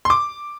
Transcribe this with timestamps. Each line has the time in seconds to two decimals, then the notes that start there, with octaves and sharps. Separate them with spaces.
0.05 C6
0.10 D6